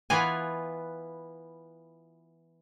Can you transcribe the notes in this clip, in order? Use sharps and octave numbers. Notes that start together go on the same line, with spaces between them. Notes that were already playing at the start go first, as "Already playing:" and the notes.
E3 B3 F4 B4 G#5